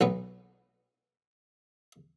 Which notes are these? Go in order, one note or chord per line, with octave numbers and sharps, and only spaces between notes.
B1 F#3 B3